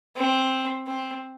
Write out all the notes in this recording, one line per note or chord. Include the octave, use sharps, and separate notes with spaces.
C4
C4